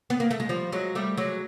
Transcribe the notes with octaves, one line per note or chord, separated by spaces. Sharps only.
B3
A#3
A3
G#3
F3 G3
F#3 G#3
G3 A3
F#3 G#3